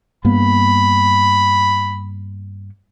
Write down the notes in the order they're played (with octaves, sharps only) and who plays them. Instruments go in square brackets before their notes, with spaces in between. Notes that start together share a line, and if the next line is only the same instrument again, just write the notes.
[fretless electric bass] G2 A#3 B3 [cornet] B5